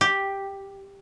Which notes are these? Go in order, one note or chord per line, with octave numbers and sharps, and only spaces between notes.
G4